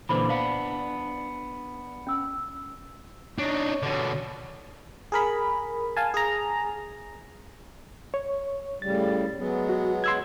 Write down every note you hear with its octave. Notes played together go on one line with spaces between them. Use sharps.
A#2 D3 E3 B4 C5 B5
B3 D4 C5 F5 B5
C#4 E6
D4 D#4 C#5
B2 D3
G#4 A#4 B5
F5 G#5 A5
G#4 A#5
C#5
A2 C#3 G3 A6
F#3 G#3 B3
F#4
C6 E6 G#6